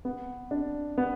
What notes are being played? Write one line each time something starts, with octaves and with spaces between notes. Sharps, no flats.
B3
D4
B3